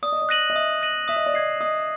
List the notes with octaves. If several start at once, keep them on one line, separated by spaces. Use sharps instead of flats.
D5 D#6
D#5
D5
F#6 A#6 D#7 F#7
D#5
E5 D#6
F#6 A#6 D#7 F#7
E5 D#6
D#5
D5
D#5 G#6 C7
D#5 D#6